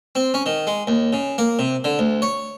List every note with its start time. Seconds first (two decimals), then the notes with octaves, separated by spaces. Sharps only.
0.15 C4
0.34 C#4
0.46 D#3
0.67 G#3
0.87 D#2
1.13 C#3
1.38 A#3
1.59 C3
1.84 D3
1.99 D2
2.22 C#5